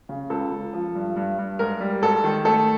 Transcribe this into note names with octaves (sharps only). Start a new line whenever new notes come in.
C#3
C#2 A4
C#2
F3
G2
G2
G2
G#2 A#4
G3
G#2 A4
D#3
A3 A4